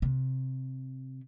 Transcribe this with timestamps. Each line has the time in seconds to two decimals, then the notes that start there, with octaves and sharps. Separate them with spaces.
0.02 C3